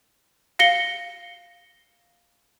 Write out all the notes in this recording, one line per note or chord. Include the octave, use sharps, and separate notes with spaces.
F5 A#6 C#7 G7